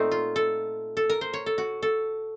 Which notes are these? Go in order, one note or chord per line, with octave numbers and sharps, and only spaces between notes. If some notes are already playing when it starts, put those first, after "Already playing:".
Already playing: A#2 A3 C4 D#4
F4
A4
A4
A#4
C5
C#5
A4
F#4
A4